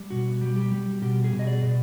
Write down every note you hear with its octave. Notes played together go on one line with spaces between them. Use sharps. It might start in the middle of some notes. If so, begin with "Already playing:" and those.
Already playing: G3
B2 F#4
G3
G4
G3
B2 G4
G#4
B2
D#5
D5
B2